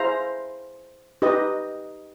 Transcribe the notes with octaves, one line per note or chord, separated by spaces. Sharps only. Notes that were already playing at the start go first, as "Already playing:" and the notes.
Already playing: E4 G#4 C5 F5 A#5
D#4 G4 B4 D#5